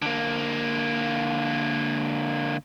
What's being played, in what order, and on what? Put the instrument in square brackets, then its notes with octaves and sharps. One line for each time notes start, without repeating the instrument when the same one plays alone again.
[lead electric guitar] D3 A#3